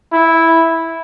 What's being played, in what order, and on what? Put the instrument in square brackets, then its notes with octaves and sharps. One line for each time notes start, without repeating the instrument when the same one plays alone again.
[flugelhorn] E4